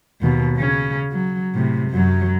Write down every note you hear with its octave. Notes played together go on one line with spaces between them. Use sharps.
D#2 B2
C#3 C#4
F#3
A2 C3
F#2 F#3